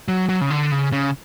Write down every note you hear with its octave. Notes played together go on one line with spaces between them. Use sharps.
F#3
F#3
C#3
D3
C#3
C#3